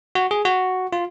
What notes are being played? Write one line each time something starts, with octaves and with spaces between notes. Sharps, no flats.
F#4
G#4
F#4
F4